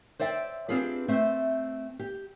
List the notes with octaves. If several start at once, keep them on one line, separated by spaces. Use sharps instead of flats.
C5 D5 E5 G5
C4 D4 F4 G4 G#4 B4
A3 C4 C5 E5
G4